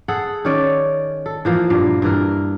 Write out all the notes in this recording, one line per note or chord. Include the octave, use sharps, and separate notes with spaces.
G#4 A4 F#5
D#3 C#4 C#5 D5
A4
E3 F3 A#3
G2 A#2 A#3
G2 E3 A#4